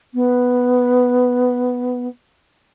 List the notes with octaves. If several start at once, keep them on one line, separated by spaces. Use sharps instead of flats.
B3